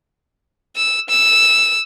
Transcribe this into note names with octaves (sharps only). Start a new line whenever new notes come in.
E6
E6